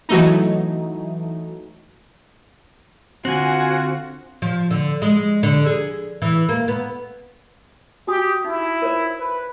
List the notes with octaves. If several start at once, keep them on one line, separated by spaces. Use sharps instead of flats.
E3 F#3 A3 D#4
D3 C4 F4 F#4 G#5 F#6
F3
D3
G#3
D3
G#4
E3
A#3
B3
F#4 G4 G#5 D#6
D#4 E4
A#4 C5 C#5
B4